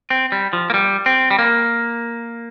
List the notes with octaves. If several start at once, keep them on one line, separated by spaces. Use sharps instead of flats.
C4
G3
F3
A#3
G3
C4
G3
A#3